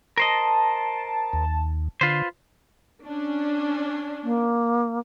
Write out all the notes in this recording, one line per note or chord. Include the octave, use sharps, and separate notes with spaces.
A#4 C5 D#5 A5
D#2
D3 F4 B4 C5
C#4 D4
A#3